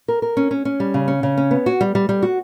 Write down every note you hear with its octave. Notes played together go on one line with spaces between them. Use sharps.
A#4
A#4
C#4
C#4
C#4
G3
C#3
C#4
C#3
C#4
B3
F#4
G3
G3
G3
F#4